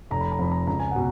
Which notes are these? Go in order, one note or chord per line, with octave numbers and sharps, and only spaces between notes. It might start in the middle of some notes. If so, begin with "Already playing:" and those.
F1 A#5
B5
A#5
F2 F3 B5
A#5
C#2 A#5
G#5
B2 F#5